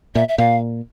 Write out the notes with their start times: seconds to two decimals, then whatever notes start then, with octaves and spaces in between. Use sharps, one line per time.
0.15 A#2 E5
0.28 E5
0.38 A#2 F5